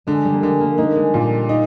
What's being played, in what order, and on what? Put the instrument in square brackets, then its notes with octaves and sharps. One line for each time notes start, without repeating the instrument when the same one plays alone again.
[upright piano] D3 [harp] G#3
[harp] G3
A#3
[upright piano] D3 [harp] G#3
[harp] A#3
[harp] A#3 [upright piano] D#4
[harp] G#3
[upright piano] A#2 [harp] G3
[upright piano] D#4